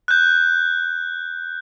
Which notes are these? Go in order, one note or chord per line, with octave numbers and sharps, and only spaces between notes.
F#6 G6